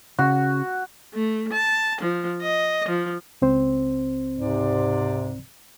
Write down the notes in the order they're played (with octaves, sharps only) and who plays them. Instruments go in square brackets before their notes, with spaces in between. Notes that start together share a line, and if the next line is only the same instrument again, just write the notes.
[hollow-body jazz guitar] C#3 [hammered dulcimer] F#4
[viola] A3
A5
F3
D#5
F3
[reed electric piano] C#2 C4 C5
[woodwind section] G#2 C3 D5